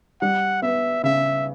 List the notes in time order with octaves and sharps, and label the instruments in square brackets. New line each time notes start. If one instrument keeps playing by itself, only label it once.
[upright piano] G3 [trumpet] F#5
[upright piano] B3 [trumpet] E5
[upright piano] C#3 [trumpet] E5